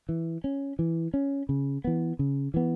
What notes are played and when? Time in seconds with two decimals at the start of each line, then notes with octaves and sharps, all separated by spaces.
0.09 E3
0.44 C#4
0.79 E3
1.14 C#4
1.49 C#3
1.84 E3 B3
2.19 C#3
2.54 E3 B3